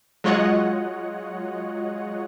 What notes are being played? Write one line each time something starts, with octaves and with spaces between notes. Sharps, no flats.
F#3 G#3 F4 C#5 D#5 F#5